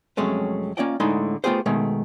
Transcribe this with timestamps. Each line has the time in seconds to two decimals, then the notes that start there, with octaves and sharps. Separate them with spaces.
0.17 F2 C3 F#3 G#3 A3 C#4
0.77 A#3 C#4 F4 D5 D#5 G5
1.00 A2 D3 G#3 D#4 B5 C6
1.44 A3 B3 F4 G4 G#4 C5
1.66 B2 D#3 G#3 A3